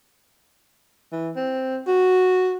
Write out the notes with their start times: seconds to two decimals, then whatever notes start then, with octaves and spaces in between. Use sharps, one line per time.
1.12 E3
1.36 C4
1.87 F#4